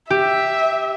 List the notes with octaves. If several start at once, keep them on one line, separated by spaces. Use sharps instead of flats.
G4 E5